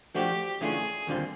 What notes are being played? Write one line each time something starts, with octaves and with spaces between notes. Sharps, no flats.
F3 A3 D4 F#4 G4
C#3 E3 A3 D4 F4 G#4
D#2 D3 G3 C4 F4